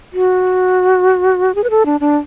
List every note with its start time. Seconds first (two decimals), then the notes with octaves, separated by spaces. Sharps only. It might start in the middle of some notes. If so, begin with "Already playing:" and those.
0.13 F#4
1.55 G#4
1.64 B4
1.70 A4
1.86 D4
2.01 D4